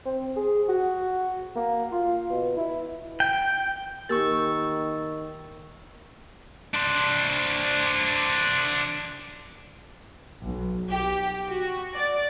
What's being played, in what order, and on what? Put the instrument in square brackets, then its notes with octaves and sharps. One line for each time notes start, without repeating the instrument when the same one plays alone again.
[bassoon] C4
G#4
F#4
A#3
F4
B2
E4
[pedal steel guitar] G5
[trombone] D#3 [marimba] A#3 G4 A#4 [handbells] C#6 E6 A6
[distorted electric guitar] D4 C5
[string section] B1
G4
F#4
D5